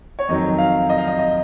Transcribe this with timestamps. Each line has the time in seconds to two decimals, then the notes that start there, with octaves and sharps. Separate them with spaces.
0.19 C#5
0.29 F2 D#3 F#3 D#5
0.58 F5
0.89 D#5
0.98 F5
1.07 D#5
1.19 D#5